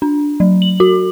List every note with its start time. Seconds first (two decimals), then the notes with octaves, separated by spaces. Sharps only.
0.02 D4
0.40 F#3
0.62 F#7
0.80 F#4